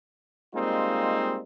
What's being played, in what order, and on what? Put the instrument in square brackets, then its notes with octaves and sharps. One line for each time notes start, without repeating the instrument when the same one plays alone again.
[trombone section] G3 G#3 A#3 C4 D#4 F4